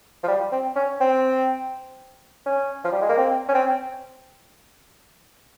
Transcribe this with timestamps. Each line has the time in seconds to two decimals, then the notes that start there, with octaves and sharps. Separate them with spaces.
0.23 F3
0.28 G3
0.52 C4
0.76 C#4
1.01 C4
2.46 C#4
2.84 F3
2.92 G3
3.02 G#3
3.09 A#3
3.18 C4
3.49 C#4
3.54 C4